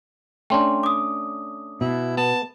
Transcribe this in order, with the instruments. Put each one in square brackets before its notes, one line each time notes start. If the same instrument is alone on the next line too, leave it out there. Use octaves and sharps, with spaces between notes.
[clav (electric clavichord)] A3 C#4 D4 [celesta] G5 C6
[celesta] D6 D#6
[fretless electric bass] B2 [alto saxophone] E4
[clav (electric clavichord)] B3 [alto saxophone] A5